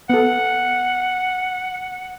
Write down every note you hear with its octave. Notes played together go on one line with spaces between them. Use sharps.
B3 A4 F#5